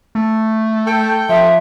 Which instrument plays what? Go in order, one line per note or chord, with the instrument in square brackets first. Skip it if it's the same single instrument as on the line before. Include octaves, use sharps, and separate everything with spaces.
[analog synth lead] A3
[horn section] A4 G5
[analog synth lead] F3 [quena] E5